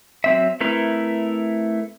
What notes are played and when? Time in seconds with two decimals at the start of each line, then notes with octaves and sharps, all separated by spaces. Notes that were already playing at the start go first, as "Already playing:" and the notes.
0.24 F#3 C4 E5
0.61 A3 C4 E4 A#4 B4